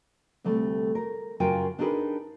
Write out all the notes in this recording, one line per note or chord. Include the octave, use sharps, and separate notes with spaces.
D2 C3 G3 A3
A#4
F#2 C#3 F4 A#4 G5 G#5
D4 D#4 G4 G#4 A#4 B4